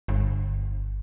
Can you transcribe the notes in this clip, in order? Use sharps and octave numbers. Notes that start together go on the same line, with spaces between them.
G1